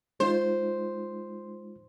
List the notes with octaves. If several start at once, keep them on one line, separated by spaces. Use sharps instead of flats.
G#3 D#4 F4 C5